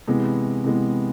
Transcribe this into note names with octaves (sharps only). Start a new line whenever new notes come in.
C3 E3 G#3 B3
C3 E3 G#3 B3